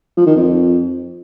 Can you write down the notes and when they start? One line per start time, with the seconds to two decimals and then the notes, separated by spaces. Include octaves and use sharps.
0.17 F3
0.27 D#3
0.36 F2